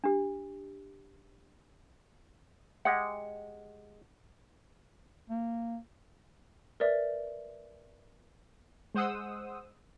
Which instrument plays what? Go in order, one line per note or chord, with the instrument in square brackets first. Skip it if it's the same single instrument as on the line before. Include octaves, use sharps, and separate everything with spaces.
[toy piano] D4 G4
[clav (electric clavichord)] G#3 G4 [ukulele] F#5
[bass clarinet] A#3
[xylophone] A#4 B4 D5 E5
[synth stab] G#3 C5 F#5 D#6 E6